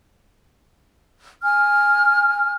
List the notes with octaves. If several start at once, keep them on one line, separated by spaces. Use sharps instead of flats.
G#5 F6